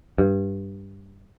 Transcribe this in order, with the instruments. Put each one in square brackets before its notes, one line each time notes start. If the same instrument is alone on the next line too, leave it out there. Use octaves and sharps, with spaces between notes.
[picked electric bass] G2